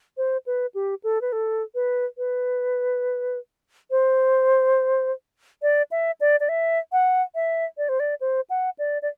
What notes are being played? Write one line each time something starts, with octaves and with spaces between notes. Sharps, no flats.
C5
B4
G4
A4
B4
A4
B4
B4
C5
D5
E5
D5
D5
E5
F#5
E5
D5
C5
D5
C5
F#5
D5
D5